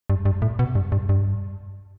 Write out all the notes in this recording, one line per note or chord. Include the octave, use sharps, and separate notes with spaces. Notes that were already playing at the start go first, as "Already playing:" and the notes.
G2
G2
A2
B2
G2
G2
G2